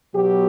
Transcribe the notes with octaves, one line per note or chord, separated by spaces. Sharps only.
B2 F#3 B3 G4